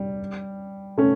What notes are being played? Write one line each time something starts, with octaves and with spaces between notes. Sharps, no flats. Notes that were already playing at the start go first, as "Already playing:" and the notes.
Already playing: G3
A3 C#4